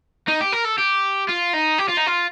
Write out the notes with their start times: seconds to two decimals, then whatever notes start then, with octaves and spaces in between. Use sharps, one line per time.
0.28 D#4
0.41 G4
0.53 A#4
0.65 A4
0.79 G4
1.29 F4
1.54 D#4
1.79 G4
1.89 F4
1.98 D#4
2.07 F4